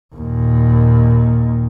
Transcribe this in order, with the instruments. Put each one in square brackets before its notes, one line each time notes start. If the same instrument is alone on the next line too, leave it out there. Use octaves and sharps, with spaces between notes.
[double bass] D#2 A#2